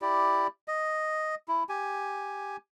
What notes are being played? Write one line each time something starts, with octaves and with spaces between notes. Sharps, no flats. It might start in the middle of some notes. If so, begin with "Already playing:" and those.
E4 G4 D5
D#5
E4
G4 G#5